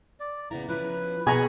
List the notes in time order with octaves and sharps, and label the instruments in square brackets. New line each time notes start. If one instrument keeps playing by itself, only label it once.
[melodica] D5
[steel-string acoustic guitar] C#3 B3 E4 [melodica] A#5
[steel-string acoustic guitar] F3 C#4 E4 [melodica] B4
[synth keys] B2 G#5 C#6 [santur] G#4 A#5 [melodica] B5